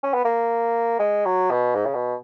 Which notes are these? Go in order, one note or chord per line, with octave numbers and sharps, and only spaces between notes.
C#4
B3
A#3
G#3
F#3
B2
G#2
C#3
B2